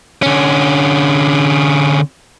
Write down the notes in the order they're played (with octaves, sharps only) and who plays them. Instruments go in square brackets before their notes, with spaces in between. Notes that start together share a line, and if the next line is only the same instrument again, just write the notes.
[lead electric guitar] D3 C#4